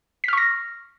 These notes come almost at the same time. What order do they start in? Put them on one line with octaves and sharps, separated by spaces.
B6 F6 C#6 A#6